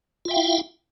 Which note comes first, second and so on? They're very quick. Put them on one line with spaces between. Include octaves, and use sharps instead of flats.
F4 E5 G5 F5 E4